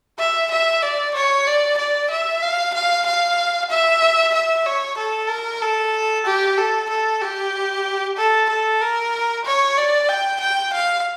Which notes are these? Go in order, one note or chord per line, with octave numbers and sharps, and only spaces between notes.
E5
E5
D5
C#5
D5
D5
E5
F5
F5
F5
E5
E5
C#5
A4
A#4
A4
G4
A4
A4
G4
A4
A4
A#4
C#5
D5
G5
G5
F5